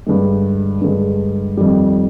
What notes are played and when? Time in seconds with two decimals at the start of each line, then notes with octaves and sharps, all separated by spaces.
0.06 G2 D3 G#3
0.81 G2 D3 G#3
1.57 F2 D#3 G3